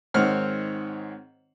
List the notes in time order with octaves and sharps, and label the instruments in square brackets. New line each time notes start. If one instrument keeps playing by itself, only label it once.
[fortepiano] G#2 D#3 C4 C#5 F#5 F6